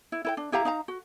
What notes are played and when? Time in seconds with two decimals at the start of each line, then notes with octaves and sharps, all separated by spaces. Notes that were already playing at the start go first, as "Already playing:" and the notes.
0.12 E4
0.25 E4 B4 G5
0.37 D4
0.52 E4 G4 F5 A#5
0.65 D#4 F5 A#5
0.88 F#4